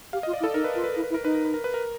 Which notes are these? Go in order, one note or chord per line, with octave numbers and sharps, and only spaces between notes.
G4 F5
D#5
F4
D5
E4
A4
D#4 A#4
B4
F4 A#4
B4
E4 A#4
B4
E4
A#4
D#4 B4
A#4
B4
A#4
B4
A#4